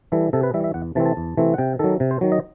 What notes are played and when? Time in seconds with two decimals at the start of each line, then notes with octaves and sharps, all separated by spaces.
0.12 E3 G3 A4
0.33 C3 A4
0.43 B4
0.54 E3 G3 E5
0.64 E5
0.74 E2 F#5
0.95 C3 E3 A3 C4 A5
1.06 A5
1.17 E2
1.37 C3 E3 A3 C4
1.54 F#5
1.58 C3 G5
1.79 D#3 F#3 A4
2.00 C3
2.11 C5
2.21 D#3 F#3
2.32 D#5